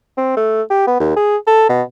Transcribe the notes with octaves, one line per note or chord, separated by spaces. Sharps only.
C4
A3
G4
B3
D#2
G#4
A4
B2